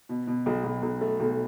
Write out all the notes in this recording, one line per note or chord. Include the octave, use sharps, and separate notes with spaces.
B2
B2
B1
B1
B1
A3
B1